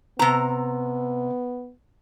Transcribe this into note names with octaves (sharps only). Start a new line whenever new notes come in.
C3 B3 A#5